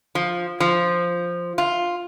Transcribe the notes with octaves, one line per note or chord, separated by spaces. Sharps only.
F3
F3
F4